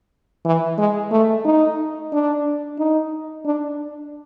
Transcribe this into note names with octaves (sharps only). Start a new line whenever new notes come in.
E3
G#3
A3
D#4
D4
D#4
D4